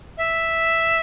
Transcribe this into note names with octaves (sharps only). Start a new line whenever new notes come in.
E5